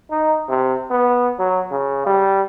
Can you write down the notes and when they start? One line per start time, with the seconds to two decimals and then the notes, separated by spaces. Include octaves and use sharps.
0.11 D#4
0.49 C3
0.91 B3
1.39 F#3
1.71 C#3
2.06 G3